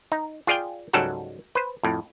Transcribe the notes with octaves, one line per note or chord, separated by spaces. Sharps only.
D#4
F4 G#4 D5 F5 G5
C#2 G#2 F#3 G3 A4 F#5
B4 C5
F2 A2